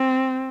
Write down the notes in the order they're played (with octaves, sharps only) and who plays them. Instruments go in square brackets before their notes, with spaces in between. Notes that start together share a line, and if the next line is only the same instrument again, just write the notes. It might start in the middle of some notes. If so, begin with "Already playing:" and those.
Already playing: [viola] C4